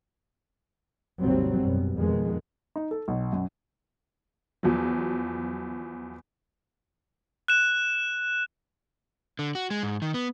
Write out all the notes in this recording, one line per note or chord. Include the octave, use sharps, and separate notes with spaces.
G#1 D#2 C3 F#3 G3 C4
F#2 B2
F2 B2 D#3 G#3
D#4
A4
B1
F#2
E2 F3 F#3
F#6 E7
D3
F#4
G#3
G#2
D#3
B3